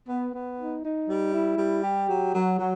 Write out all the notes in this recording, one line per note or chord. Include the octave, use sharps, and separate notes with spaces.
B3
B3
D#4
D#4
G3
E4
G3
G4
F#3
F#3
F#3